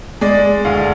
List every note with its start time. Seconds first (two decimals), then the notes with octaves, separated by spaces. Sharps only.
0.21 G#3 D5
0.65 D2 F5